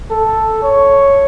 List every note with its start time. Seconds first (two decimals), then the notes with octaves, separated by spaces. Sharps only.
0.11 A4
0.63 C#5